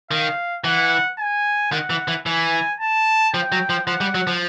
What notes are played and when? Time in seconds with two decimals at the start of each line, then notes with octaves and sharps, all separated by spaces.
0.11 D#3 F5
0.64 E3 F#5
1.19 G#5
1.72 D#3 F#5
1.90 E3
2.08 E3
2.26 E3 G#5
2.80 A5
3.33 F3 G5
3.52 F#3
3.70 F3
3.87 F3 F#5
4.01 G3
4.15 F#3
4.27 F3